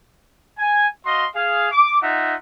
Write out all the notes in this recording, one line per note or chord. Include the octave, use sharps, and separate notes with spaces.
G#5
F#4 D#5 F5 C6
G#4 F5
D6
D#4 F4 E5 F#5